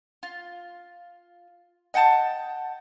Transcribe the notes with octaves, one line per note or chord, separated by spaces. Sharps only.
F4
D#5 F#5 G5 A5